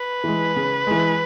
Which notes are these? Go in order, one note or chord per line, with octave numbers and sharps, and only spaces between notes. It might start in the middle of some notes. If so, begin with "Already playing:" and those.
Already playing: B4
E3 G#3
C#3
E3 G#3